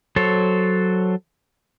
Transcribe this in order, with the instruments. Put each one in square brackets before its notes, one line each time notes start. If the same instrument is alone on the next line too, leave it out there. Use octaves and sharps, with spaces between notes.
[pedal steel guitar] F#3 A4 C5 C#5